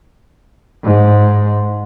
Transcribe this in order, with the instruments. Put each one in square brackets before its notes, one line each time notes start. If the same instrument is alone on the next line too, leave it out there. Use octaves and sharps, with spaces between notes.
[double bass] G#2